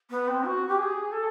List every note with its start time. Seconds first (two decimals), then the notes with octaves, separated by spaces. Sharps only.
0.10 B3
0.27 C4
0.44 F#4
0.68 G4
0.78 G#4
1.12 A4